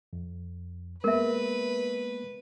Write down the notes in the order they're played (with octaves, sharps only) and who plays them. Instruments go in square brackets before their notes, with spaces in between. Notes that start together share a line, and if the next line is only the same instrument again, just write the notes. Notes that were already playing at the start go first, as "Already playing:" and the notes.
[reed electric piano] F2
[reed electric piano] G#3 A#3 B3 [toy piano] A#4 E5 [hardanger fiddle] B4